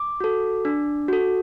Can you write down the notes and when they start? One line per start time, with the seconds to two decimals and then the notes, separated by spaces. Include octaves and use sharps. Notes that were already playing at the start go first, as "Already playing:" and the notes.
Already playing: D6
0.20 F#4 A4
0.65 D4
1.08 F#4 A4